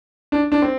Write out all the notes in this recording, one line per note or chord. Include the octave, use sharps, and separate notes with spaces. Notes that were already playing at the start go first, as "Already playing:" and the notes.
D4
D4
C4